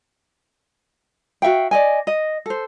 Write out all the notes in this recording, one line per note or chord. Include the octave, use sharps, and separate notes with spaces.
F#4 E5 F5 G5
D5 D#5 G#5
D#5
A4 C5